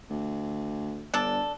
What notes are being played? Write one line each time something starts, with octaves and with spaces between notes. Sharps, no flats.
D2
G1 D4 A4